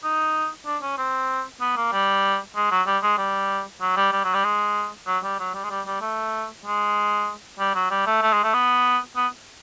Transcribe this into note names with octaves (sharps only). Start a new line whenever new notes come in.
D#4
D4
C#4
C4
B3
A#3
G3
G#3
F#3
G3
G#3
G3
F#3
G3
G3
F#3
G3
G#3
F#3
G3
F#3
G3
G#3
G3
G3
A3
G#3
G3
F#3
G3
A3
A3
G#3
A3
B3
B3